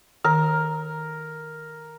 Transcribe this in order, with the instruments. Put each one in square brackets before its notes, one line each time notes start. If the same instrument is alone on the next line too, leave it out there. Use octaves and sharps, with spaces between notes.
[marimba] D#3 [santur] A#4